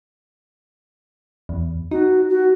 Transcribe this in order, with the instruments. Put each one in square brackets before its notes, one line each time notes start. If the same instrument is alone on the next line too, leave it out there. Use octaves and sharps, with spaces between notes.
[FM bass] E2
[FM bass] D#4 [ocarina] F#4
[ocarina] F#4